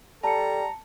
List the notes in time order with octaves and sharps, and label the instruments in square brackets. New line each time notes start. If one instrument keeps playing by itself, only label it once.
[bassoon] G3 [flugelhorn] A4 [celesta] A5 C#7 [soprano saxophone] A#5